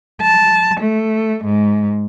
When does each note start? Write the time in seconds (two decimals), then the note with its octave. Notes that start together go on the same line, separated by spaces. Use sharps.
0.21 A5
0.80 A3
1.44 G#2